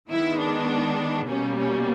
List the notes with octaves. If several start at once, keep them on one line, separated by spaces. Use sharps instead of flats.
D#3 G#3 B3 E4
D4
B2 G3 A#3 C#4
C#4